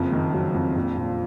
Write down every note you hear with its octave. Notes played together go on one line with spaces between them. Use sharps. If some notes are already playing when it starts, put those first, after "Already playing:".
Already playing: F#1 F2
D#3
F#3
F2
A#1
A#2